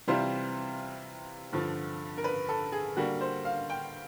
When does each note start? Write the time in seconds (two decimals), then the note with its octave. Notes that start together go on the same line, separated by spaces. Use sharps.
0.07 C3 E3 G3 C4 F4 C5
1.53 G2 D3 F3
2.18 A#4
2.24 B4
2.49 A4
2.72 G#4
2.97 D3 G3 A#3 F#4
3.21 C5
3.45 F5
3.70 G5